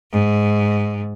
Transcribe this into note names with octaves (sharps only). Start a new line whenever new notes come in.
G#2